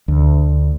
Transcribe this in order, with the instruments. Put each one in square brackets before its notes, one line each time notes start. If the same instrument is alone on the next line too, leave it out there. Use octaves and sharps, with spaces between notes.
[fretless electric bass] D2